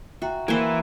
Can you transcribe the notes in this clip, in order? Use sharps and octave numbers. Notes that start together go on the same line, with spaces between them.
F#4 E5 G5 A#5
E3 A#3 E4 C5